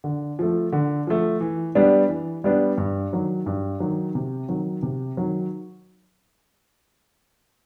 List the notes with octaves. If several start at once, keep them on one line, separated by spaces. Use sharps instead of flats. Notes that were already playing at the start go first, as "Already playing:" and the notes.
D3
F3 A3
D3
F3 A3
E3
G3 B3 D4
E3
G3 B3 D4
G2
D#3 F#3
G2
D#3 F#3
C3
D#3 F#3
C3
D#3 F#3